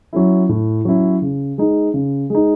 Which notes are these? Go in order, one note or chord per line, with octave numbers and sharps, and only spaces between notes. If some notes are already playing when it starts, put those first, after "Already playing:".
F#3 C#4 E4
A2
F#3 C#4 E4
C#3
G#3 D#4
C#3
G#3 D#4